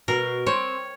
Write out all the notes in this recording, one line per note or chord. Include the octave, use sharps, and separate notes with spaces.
B2 A#4
C4 C#5